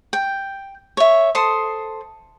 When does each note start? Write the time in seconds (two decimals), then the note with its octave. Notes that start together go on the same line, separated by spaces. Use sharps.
0.13 G5
0.97 C#5 E5
1.35 A4 C5 C6 D#6